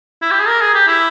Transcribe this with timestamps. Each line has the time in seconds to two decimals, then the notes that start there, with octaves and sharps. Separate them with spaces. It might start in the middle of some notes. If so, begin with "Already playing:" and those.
0.22 E4
0.31 G4
0.40 G#4
0.48 A#4
0.61 G#4
0.74 G4
0.88 E4